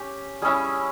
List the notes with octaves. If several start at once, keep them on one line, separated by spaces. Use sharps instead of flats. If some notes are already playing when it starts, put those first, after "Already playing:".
Already playing: C#4 G4
G3 C#4 E4 G#4